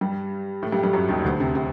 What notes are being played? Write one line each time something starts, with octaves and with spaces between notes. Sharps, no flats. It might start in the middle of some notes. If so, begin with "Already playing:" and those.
G2 G3
A2 A3
G2 G3
G2 G3
F#2 F#3
D#2 D#3
D2 D3
C3
C3